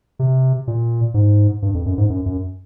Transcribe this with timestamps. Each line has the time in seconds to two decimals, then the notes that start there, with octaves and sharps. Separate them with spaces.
0.19 C3
0.67 A#2
1.14 G#2
1.62 G2
1.74 F2
1.86 F#2
1.98 G#2
2.10 F#2
2.26 F#2